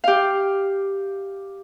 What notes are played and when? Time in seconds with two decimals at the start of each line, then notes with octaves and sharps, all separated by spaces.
0.04 G4 F5